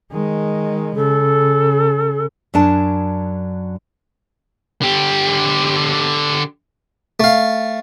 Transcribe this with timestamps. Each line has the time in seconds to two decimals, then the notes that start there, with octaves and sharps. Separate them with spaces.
0.12 D#3 G#3
0.95 C#3 A4
2.54 F#2 F#3 D4 A5
4.82 D3 G4
7.20 A3 F5